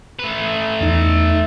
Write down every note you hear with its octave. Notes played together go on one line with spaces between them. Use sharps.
A3 B4
E2 D#4